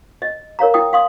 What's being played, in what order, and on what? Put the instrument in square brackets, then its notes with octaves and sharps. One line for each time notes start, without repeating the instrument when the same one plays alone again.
[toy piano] D#5
A#4 C#5 F5 A#5
E4 G5 D#6
F5 C6 D#6